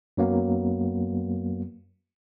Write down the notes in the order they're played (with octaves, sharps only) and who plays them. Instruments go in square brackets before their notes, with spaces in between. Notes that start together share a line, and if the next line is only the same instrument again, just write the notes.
[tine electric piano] F#2 F#3 A#3 B3